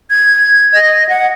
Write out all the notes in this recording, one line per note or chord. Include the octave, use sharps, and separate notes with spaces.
G#6
D#5
F#5